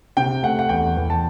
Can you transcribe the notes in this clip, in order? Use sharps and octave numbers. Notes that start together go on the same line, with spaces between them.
C3 G5
A3 F#5
F#5
E2 G5
E2
A5